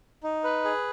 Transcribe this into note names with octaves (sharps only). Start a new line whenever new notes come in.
D#4
B4
G#4